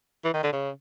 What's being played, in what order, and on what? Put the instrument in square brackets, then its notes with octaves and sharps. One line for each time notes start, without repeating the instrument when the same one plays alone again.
[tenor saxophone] E3
D#3
D3
C#3